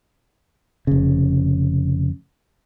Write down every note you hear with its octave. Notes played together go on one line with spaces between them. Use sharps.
F1 C#3